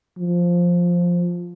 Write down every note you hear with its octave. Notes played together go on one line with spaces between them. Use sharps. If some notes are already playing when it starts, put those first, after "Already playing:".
F3